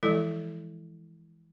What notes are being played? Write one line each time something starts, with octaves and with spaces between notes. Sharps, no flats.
E3 F3 G#3 E4 A4